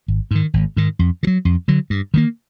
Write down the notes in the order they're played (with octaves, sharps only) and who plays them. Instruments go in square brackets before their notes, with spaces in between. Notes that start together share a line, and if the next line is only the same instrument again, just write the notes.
[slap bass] G#1
G#2 D#3
G#1
G#2 D#3
F2
D3
F#3
F2
D3 F#3
G2
D#3 F#3 A#3